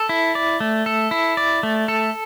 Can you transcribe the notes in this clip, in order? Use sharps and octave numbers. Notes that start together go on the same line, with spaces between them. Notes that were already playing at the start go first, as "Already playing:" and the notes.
Already playing: A4
E4
D5
A3
A4
E4
D5
A3
A4